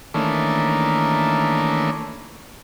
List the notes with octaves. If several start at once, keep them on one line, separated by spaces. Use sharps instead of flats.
D#3 E3 A3 A#3 C#4 D4